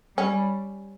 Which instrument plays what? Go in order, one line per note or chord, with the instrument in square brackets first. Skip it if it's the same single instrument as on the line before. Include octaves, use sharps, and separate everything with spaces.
[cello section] G3 [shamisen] C#4